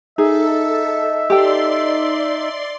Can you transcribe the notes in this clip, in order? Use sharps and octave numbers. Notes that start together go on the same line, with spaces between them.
D#4 G#4 A4 E5
G4 A4 D5 G5 C6